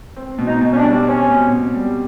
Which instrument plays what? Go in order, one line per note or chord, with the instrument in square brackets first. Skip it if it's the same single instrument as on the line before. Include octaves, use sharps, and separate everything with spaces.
[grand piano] C4
B2
[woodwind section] D#4
[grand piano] B2
[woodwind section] C#4
D4
[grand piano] G3
[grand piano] C4 [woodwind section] C#4
[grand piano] B2
B2
G3